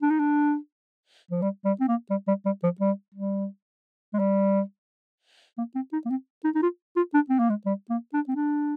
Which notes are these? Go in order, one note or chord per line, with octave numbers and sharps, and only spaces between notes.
D4
D#4
D4
F3
G3
G3
C4
A#3
G3
G3
G3
F3
G3
G3
G#3
G3
A#3
C4
D#4
A#3
C4
D#4
D#4
F4
F4
D4
C4
A#3
G#3
G3
A#3
D4
C4
D4